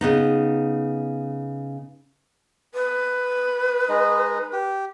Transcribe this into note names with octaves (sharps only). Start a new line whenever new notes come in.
C#3 B3 D#4
B4
G#3 D#4
G4